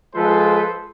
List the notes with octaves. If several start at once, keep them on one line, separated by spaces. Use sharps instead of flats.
F3 G#3 F4 A4 B4 C5